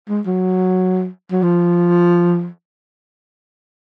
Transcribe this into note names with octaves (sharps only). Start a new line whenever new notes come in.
G#3
F#3
F#3
F3